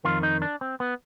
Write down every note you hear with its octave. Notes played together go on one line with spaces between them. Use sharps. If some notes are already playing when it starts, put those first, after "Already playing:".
F2 D#3 F4
D#4
D4
C4
B3